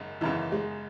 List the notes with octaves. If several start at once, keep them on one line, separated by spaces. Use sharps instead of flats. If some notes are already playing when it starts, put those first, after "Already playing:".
Already playing: G#1 F#2 C#3
G#1 F#2 C#3 E3
G#3